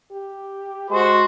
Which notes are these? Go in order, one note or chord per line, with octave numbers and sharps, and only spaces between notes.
G4
G#3 F#4 C5